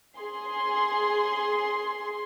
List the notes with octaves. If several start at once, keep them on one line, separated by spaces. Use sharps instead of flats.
G#4 C6